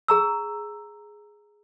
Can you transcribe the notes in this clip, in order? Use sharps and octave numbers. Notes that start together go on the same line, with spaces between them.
G#4 A#5 E6